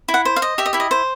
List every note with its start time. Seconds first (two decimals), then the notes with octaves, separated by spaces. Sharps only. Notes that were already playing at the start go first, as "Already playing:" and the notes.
0.08 E4
0.14 F#5
0.25 C5
0.36 F5
0.42 D#5
0.58 G4 E5
0.66 D#5
0.73 E4 E5
0.80 D#5
0.91 C5